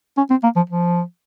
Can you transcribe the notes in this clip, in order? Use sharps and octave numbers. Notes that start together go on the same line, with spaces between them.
C#4
C4
A#3
F3
F3